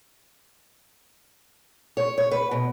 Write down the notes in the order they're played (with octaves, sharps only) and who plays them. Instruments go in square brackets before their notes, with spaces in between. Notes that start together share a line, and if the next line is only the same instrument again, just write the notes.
[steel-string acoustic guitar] C#5
C#5
B4
B2